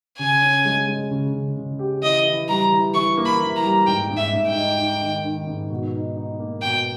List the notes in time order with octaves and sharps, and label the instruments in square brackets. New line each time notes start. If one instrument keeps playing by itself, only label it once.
[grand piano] C#3 [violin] G#5
[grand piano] C#4
G#3
G#3
C#3
C#3
C#3
G4
[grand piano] E3 [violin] D#5
[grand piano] E3
[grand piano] G3 [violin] A#5
[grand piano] E3
[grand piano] E3 [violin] C#6
[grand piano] A#3
[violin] B5
[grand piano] E3
[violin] A#5
[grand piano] G3
[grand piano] G#2 [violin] G5
[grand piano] G#2
[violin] E5
[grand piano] G#2
[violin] G5
[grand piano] D#4
D#4
D#3
D#3
G#2
B2
D#4
D#4
A#3
[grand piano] B2 [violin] G5